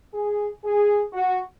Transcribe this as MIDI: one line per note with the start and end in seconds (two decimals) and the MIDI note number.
0.14 0.47 68
0.64 1.02 68
1.13 1.41 66